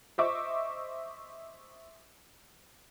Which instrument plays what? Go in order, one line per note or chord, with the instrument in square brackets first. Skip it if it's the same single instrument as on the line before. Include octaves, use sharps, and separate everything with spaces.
[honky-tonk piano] C5 D#5 E5 C#6 D6